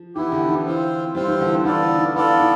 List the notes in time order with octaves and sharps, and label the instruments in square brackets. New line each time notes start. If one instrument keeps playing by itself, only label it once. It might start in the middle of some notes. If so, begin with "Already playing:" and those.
Already playing: [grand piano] F3
[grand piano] E3 [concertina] B3 E4 G4
[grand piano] D3
E3
[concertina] C4 F4 C5
[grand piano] G3 [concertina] C4 F4 C5
[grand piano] E3
D3
E3
[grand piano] E3 [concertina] B3 F4 A4 D5
[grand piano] D3
E3
[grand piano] E3 [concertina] B3 F4 A4 D5
[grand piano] E3